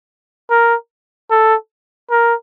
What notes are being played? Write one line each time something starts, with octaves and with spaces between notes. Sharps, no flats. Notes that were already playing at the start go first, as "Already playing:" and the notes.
A#4
A4
A#4